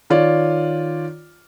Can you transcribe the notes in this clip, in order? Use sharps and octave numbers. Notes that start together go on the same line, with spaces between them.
D#3 F4 C#5 D5